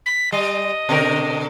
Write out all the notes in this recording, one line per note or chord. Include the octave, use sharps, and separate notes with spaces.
B6
G3 D#5
B2 D3 A#4